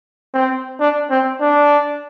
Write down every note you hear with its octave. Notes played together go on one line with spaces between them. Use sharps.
C4
D4
C4
D4